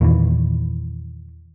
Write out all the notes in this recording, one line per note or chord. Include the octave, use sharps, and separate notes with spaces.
E2 A#2 D#3 E3